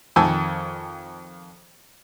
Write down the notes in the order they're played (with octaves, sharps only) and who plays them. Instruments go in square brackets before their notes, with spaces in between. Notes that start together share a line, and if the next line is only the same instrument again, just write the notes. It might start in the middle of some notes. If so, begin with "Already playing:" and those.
[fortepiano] F2 D#3 G#5 A5 E6